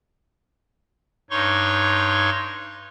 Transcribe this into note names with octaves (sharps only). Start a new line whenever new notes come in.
G2 D#4 C#5 C6 C#6